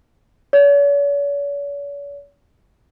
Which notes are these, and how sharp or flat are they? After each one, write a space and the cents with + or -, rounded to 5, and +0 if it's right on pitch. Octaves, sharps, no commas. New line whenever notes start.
C#5 +45